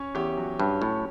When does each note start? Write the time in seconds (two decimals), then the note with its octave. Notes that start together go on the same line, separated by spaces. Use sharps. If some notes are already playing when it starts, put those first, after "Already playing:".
Already playing: C#4 C#5
0.15 E2 G4
0.37 F#3
0.59 G2 C#5
0.82 A2 C#4